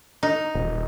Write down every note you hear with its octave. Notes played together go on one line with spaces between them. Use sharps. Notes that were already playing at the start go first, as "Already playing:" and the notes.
D#4
D#1